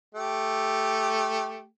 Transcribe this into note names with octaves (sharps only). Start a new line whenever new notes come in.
A3 G4